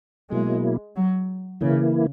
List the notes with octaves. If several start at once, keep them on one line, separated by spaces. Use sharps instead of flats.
B2 F#3 G#3 A#3 E4
F#3
C#3 E3 A#3 E4